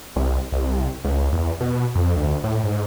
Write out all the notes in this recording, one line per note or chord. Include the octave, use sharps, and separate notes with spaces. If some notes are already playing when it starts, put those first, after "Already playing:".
C2
C2
C#2
E2
B2
F2
D2
A2
G#2